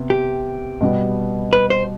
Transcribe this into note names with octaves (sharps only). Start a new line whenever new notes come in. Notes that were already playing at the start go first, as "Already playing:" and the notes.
Already playing: C3 B3
G4
B2 G3 B3
B4
C5